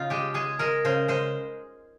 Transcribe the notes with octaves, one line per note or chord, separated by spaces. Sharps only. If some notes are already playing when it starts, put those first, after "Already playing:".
Already playing: C#3 D#4 F4
G#3 G4
G#3 G#4
G#3 A#4
C#3 C5
G#3 C5